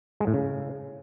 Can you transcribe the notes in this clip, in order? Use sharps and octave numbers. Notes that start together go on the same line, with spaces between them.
G#3
A2
C#3